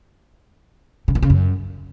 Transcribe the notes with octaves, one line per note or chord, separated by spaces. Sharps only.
C#3
A#2
C#3
F#2